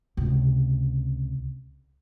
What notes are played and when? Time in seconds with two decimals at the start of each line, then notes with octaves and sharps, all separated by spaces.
0.17 C#2 C3